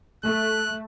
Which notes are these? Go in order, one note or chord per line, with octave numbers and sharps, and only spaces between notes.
A3 F#6